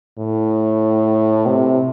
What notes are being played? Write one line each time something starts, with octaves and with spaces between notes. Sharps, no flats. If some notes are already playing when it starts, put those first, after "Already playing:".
A2
C3